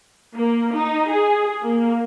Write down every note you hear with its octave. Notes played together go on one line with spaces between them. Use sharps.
A#3
D#4
G#4
A#3